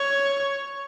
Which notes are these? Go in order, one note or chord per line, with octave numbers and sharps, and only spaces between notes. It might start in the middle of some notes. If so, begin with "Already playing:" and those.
Already playing: C#5